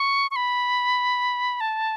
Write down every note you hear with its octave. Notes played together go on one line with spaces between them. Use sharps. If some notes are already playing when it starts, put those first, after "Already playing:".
Already playing: C#6
C#6
B5
A5